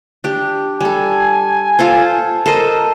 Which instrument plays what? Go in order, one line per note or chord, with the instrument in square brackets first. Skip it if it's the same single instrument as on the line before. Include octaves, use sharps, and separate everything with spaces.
[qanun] D4 G4
[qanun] G3 A4 [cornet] G#5
[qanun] F4 A4 C5
[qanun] A4 C5 D#5 [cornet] A#4